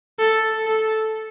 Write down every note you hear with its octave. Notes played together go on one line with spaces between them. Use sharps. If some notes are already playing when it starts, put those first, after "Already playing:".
A4
A4